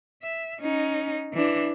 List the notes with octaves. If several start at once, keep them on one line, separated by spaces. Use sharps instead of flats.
E5
C#4 D#4
E3 D4